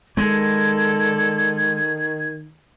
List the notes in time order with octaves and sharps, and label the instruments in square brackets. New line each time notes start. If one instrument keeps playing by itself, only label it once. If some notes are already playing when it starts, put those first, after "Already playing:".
[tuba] D#3 [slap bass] G#3 [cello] A4 D5 [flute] G#6